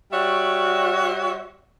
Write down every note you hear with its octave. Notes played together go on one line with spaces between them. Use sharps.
G3 F#4 C#5 D5 E5